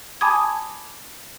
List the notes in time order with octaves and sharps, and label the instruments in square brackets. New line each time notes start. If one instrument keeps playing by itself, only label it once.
[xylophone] G#5 A5 B5 D6 D#6 G#6